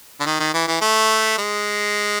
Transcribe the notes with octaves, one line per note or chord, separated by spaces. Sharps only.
D3
D#3
D#3
E3
E3
A3
G#3